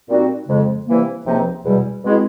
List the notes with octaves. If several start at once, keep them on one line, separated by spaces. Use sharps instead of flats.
A#2 G3 C4 D#4 F#4
F2 C#3 F3 G#3
C3 E3 G3 A#3
C#2 C3 F3 A#3 D#4
E2 B2 G3
B2 G#3 C4 E4 G#4